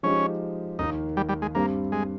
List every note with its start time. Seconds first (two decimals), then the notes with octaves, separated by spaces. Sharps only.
0.03 F3 G#3 C#4 D#4 G4
0.79 D#2 D#3 A#3 D#4
1.17 G3
1.29 G3
1.42 G#3
1.55 G2 G3 A#3 C4
1.92 G#3